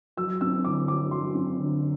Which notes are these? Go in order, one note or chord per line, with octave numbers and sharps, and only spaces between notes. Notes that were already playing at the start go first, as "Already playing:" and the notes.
F#3 E6
C4 E6
D3 D6
F#3 D6
F#3 C6
C4
D3